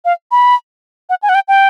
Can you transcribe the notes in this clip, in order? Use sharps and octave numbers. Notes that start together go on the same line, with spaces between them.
F5
B5
F#5
G#5
F#5
G5
G5